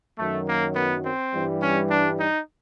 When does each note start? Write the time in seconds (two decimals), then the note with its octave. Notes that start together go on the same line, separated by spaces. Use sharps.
0.18 F#2 D#3 F#3 A3
0.47 A#3
0.75 B3
1.05 C4
1.33 G2 E3 G3
1.62 C#4
1.90 D4
2.20 D#4